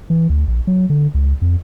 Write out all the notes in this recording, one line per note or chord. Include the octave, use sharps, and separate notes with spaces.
E3
D2
A#1
F#3
D3
C#2
F2